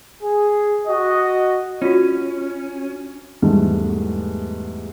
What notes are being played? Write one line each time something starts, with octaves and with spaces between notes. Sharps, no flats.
G#4
F#4 D#5
C#4 F4 F#4
E2 G#2 G3 A3